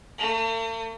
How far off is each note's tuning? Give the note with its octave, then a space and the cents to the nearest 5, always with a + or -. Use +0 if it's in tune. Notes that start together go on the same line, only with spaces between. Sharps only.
A3 +45